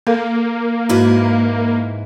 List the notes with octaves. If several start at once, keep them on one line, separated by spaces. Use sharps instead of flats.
A#3 A4 A#4 F5
G#2 E4 F#4 B4